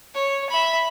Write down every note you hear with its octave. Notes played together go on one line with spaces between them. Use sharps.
C#5
E5 B5